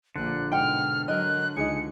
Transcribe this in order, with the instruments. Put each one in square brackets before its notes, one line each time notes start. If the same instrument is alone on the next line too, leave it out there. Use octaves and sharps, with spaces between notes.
[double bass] A#1 A#2 [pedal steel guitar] D3 [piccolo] F#6
[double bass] G#2 B2 [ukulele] F#5 G5 [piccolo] F6
[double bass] F#3 [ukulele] A#4 D#5 [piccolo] F#6
[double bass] C#2 [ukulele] D#4 G#4 [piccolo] C#7